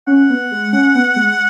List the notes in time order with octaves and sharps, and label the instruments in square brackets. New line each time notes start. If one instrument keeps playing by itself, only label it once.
[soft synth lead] C#4 [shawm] F#5
[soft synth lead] B3
G#3
C#4
B3
G#3